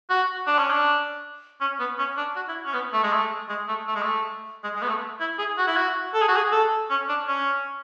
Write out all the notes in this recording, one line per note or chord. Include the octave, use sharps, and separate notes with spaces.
F#4
D4
C#4
D4
C#4
B3
C#4
D4
F#4
E4
C#4
B3
A3
G#3
A3
G#3
A3
A3
G#3
A3
G#3
G#3
B3
A3
E4
G#4
F#4
E4
F#4
A4
G#4
F#4
G#4
A4
C#4
D4
C#4